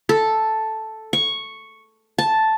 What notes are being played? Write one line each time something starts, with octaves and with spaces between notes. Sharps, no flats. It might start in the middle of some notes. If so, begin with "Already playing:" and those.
A4
C#6
A5